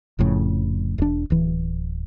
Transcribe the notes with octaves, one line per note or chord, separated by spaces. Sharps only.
F1 F2 A2 C#3
E1 D4
D1 E3